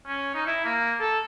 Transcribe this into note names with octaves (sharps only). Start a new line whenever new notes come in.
C#4
D#4
E4
A#3
A4